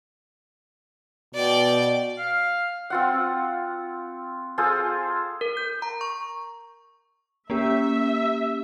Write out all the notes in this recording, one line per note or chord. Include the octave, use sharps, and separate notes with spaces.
B2 D5 G5
F5
C4 F4 F#5
F4 G#4 A4 C5
A#4
G6
A#5
C#6
A#3 C#4 G4 E5